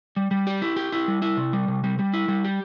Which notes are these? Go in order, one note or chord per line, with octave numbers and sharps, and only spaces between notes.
G3
G3
G4
E4
G4
E4
G3
E4
C3
G3
C3
G3
G3
E4
G3
G4